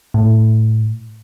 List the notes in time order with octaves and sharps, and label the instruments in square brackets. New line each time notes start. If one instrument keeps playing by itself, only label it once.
[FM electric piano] A2